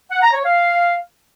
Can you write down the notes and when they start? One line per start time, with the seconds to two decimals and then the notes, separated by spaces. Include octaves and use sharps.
0.11 F#5
0.22 A#5
0.33 C#5
0.44 F5